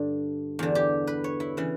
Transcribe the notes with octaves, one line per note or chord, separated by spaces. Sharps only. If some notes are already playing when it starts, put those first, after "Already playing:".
Already playing: G2 D3
E2 D3
G4
B4
C#5
E4
C#3 E3